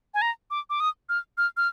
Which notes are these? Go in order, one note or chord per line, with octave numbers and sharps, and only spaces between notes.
G#5
A#5
D6
D6
D#6
F6
F6
F6